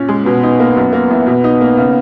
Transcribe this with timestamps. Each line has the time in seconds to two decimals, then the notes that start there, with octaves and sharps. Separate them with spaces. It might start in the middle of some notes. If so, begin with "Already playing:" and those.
Already playing: A#2 C#4
0.08 G#3
0.26 B2 B3
0.43 D#4
0.60 A#3
0.76 F#2
0.93 A#3
1.11 E3
1.26 B2
1.44 D#4
1.61 A#3
1.77 C#3